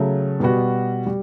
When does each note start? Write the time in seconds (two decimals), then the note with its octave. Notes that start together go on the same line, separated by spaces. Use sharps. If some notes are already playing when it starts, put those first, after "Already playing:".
Already playing: C#3 F#3 A3
0.40 B2 G3 B3 F#4
1.06 G3